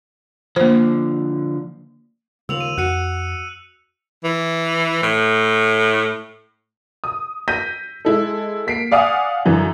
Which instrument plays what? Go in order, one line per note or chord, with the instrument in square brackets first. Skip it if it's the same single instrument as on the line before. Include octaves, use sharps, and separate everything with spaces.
[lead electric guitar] D3 F3 [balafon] A#3 C5
[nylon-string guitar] D#2 A#3 F4 [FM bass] C#3 [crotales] E6 F7 F#7
[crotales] D#7
[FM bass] F2 [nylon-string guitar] F#4 [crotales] F#6 C#7 D#7
[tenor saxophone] E3
A2
[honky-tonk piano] D#6
G6 A#6 B6 D#7
G#3 E4 A4
A#3 B6 C7 D7
D5 F5 F#5 G#5 D#6
F#2 D3 E3